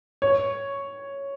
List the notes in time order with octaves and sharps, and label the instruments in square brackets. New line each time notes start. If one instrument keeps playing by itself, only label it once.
[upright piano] C#5